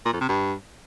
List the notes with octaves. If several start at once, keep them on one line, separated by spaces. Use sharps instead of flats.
A#2
F2
C3
G2